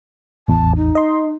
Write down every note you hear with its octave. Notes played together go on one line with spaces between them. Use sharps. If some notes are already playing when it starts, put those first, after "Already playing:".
A1 E2 A5
D#4
D#5 C6